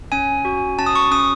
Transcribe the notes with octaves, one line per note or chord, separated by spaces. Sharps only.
C#4 G#5
F#4
C#4 A5
D#6
C#6
C#4 D#6